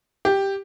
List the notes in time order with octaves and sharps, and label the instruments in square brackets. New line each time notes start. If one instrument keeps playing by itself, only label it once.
[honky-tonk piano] G4